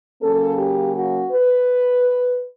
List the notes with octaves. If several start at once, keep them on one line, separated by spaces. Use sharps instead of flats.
C#3 F#3 A#3 C#4 A4
G4
F#4
B4